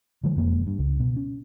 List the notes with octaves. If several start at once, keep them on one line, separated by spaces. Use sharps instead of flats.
D3 E3 F3 G#3
E1 F2 G#3 A#3
G2
C#2
B2
C#4